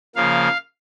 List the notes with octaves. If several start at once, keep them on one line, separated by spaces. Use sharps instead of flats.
C#3 F3 A#3 F5